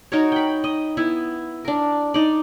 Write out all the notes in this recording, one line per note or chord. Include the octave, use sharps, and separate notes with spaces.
D#4 F#4 A#4 C#5
G5 B5
D#5
B3 E4
D4 A#4
D#4 D5